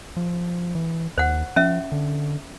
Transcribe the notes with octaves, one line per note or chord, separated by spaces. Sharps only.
F3
E3
D#2 C5 F#5
F3 C#4 E5
D3